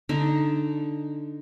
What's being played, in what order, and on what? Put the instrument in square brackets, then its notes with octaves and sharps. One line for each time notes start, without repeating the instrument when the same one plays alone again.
[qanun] D3 D#4 A5 A#5